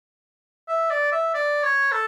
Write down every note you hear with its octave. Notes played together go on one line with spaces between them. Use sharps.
E5
D5
E5
D5
C#5
A4